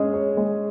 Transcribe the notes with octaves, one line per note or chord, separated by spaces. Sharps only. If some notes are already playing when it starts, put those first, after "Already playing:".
Already playing: G#3 C#4 G#4 D#5
C#5
G#3